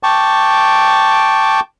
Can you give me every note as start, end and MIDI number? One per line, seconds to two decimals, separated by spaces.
0.03 1.60 79
0.03 1.60 81
0.03 1.60 85
0.03 1.60 86